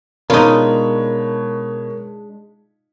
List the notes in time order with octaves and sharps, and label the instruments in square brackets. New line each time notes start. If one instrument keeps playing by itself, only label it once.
[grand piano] B2 C#5 B5 [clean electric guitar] G#3 D4 [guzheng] D#4 F4 [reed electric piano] A#4